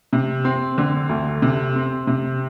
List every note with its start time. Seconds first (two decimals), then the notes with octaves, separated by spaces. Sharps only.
0.13 C3
0.45 C4
0.78 D3
1.09 D2
1.42 C3
1.76 C4
2.07 C3